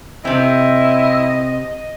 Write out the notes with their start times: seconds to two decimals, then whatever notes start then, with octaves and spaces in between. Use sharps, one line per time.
0.25 C3 C4 E4 D#5